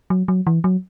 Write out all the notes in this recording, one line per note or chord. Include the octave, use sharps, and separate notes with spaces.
F#3
F#3
E3
F#3